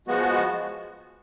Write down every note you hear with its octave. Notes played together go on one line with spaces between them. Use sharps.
F3 G#3 B3 F#4